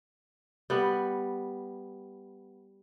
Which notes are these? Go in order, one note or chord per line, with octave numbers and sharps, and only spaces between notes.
G3 B3